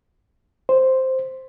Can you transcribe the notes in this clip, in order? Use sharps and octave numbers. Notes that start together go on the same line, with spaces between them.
C5